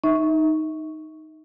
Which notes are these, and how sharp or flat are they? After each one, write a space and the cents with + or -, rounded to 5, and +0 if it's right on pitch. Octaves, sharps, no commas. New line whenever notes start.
D#4 +0 E5 -25